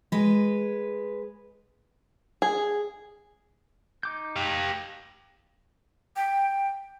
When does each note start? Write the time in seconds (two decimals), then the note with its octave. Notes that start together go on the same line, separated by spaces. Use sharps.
0.12 G#3 B4
2.42 G#4
4.03 D#4 D6 G6
4.36 G4 F5
6.16 G5